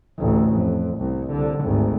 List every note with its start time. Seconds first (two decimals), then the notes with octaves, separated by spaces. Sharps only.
0.18 A1 D2
0.56 F2
0.98 C2
1.31 C2 D3
1.60 G#1 D2